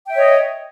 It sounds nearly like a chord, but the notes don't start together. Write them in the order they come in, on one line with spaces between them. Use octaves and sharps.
G5 E5 C#5 D#5